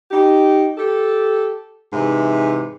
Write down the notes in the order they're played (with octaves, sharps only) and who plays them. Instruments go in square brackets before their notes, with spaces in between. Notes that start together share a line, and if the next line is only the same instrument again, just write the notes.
[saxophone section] D#4 G4
G4 A4
G#2 C3 E3 B4